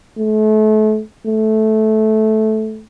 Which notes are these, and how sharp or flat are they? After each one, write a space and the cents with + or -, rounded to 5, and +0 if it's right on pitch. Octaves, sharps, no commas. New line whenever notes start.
A3 -35
A3 -15